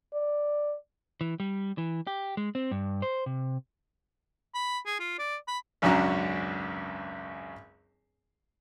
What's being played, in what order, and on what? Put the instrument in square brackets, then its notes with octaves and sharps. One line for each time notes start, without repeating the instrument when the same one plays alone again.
[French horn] D5
[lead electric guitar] E3
G3
E3
G4
G#3
C4
G2
C5
C3
[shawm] B5
G#4
F4
D5
B5
[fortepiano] G#1 C#2 F#2 D4 F#4 A#5